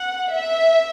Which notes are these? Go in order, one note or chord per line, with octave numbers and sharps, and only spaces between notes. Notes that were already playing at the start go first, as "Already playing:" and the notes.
Already playing: F#5
E5